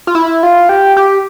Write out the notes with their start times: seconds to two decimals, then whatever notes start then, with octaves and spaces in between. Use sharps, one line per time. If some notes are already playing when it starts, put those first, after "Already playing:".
0.07 F4
0.15 E4
0.43 F4
0.69 G4
0.97 G4